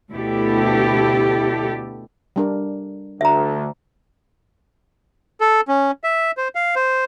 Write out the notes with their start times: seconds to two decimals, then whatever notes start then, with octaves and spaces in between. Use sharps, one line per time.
0.11 D2 B2 E4 G4 A4
2.36 G3 D4 A#4
3.21 D2 D3 E5 A#5
5.41 A4
5.68 C#4
6.04 E5
6.37 C5
6.55 F5
6.76 C5